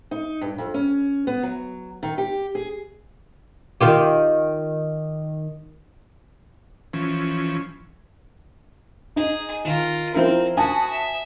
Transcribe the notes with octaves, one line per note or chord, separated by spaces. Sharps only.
D#4
G2
F2
C#4
B3
F#3
D#3
G4
G#4
D#3 F4 G4
E3 F3 C#4
D#4 G#4
D#3 F4 A#4
F3 C4 E4 A#4
F#4 G#5 A5 B5 D#6
E5